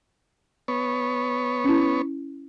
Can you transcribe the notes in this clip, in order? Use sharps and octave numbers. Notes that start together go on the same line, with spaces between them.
B3 C#5
C#4 E4